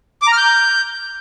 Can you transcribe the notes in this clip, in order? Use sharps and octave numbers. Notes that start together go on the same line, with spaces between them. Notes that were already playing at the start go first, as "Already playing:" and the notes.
D6
A#5
F6
G6